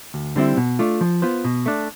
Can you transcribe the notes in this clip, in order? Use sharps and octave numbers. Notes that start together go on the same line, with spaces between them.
D2
D3 G3 C4 E4
B2
A3 D4 F4
F3
B3 F4 C5
B2
A3 D4